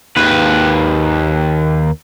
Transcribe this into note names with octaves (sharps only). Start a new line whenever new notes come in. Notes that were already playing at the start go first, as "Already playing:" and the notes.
D#2 B4